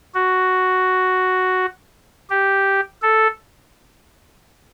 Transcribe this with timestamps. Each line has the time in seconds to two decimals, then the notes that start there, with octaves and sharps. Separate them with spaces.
0.15 F#4
2.30 G4
3.02 A4